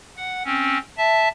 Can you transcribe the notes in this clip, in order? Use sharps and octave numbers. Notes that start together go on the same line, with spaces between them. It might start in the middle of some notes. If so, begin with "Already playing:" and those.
F#5
C4 C#4
E5 A5